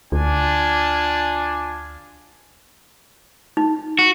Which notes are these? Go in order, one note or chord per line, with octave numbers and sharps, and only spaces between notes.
D2 D4 F4 G#5
D#4
F#4